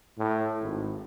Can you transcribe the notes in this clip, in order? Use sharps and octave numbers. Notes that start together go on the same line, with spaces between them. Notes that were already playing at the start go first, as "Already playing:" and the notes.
A2
G#1